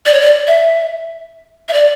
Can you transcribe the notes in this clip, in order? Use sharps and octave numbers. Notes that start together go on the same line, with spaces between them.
D5
C#5
D5
E5
E5
D5